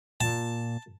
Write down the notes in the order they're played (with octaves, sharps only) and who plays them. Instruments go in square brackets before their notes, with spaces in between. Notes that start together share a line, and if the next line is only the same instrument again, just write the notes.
[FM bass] A#2 [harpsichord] A5